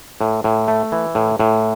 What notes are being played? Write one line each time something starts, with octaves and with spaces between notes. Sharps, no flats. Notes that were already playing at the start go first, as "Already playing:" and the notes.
A2
A2
A3
E3
A2
A2